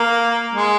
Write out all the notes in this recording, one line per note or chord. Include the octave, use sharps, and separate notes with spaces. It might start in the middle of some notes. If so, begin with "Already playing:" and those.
Already playing: A#3
G#3